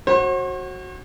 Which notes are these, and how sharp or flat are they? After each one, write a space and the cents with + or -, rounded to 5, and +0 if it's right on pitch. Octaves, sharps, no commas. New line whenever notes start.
F#4 +0 C5 +45